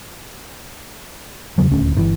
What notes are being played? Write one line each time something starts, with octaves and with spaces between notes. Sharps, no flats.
E2 C#3 F#3
D#1 D2 C#4
G1 D3 E3